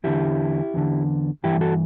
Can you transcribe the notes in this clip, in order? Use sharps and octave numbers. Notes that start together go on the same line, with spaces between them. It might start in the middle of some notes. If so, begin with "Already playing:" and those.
E2 D3 E4 G4
E2 D3
G2 E3 E4 G4
F#4 A4